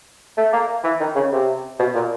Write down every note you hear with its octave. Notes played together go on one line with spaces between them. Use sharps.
A3
A#3
E3
D#3
C#3
C3
B2
A#2